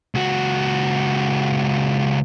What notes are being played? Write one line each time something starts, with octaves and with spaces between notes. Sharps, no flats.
C#2 F#4